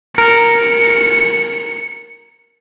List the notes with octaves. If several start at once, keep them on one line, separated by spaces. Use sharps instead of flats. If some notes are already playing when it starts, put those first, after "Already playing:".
A#4 C#7